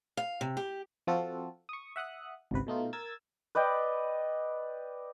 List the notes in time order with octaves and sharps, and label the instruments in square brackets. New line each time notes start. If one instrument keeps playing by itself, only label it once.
[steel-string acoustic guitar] F5
C3
G4
[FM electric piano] F3 C4 F4 F#4 A4
C#6 D#6
E5 F#5 D#6 F#6
G#1 C#2 C3 B4
B2 A3 D#4 F4
A#4 E6 G#6 A6
[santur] B4 D5 D#5 G5